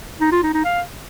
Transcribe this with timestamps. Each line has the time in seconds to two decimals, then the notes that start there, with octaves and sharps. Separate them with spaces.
0.21 D#4
0.32 F4
0.43 D#4
0.54 D#4
0.65 F5